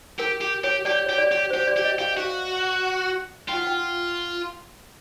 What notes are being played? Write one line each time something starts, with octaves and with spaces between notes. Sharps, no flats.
G4 A#4
G4
G4 C#5
G4 D5
G4 C#5
D5
G4
G4 C5
D5
G4
D#5
G4 F5
F#4 F5
F4 G5
F#5
G5